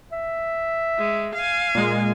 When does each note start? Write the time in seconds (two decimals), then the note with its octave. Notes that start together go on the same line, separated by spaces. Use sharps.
0.12 E5
0.98 G#3
1.35 F5 G#5
1.75 A#2 G#3